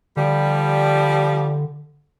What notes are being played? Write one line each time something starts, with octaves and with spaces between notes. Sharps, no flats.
D3 F3 G3